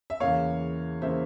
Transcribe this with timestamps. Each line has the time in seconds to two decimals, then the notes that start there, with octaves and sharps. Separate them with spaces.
0.10 E5
0.20 E2 C#3 E3 A#3 C#5 F5
1.01 C#3 E3 A#3 C5 E5